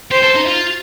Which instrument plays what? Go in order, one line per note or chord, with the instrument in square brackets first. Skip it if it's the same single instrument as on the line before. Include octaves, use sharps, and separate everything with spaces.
[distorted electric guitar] G4 [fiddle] C5
[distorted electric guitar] A4
D#4
F4